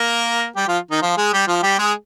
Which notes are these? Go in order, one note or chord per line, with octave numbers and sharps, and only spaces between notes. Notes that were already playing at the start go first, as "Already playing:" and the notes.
Already playing: A#3 A#4
G3 G4
F3 F4
D#3 D#4
F3 F4
G#3 G#4
G3 G4
F3 F4
G3 G4
G#3 G#4